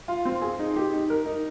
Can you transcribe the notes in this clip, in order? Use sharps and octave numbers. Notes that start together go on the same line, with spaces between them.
F4
C4
G#4
D#4
G4
D#4
A#4
D#4